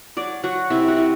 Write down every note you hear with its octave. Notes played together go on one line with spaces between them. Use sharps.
F#3 D5
F#3 F#4
C3 E4
F#4
E4